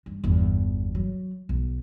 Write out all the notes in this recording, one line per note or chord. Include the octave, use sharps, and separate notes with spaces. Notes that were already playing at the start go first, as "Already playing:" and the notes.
G2
G1 E2
F#3
B1